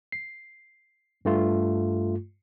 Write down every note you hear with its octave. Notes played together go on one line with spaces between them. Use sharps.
C7
G2 A3 F4